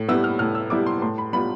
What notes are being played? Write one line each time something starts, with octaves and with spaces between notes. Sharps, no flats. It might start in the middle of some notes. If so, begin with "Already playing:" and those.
Already playing: A2
G3 B3 E4 E6
F6
A2 F6
E6
G3 B3 E4 D6
C6
A2 C6
B5
G3 B3 F4 B5